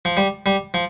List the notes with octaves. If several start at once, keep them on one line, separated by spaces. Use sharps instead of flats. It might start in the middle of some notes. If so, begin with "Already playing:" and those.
F3
G3
G3
F3